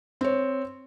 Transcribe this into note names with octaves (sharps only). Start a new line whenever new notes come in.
C4 C#5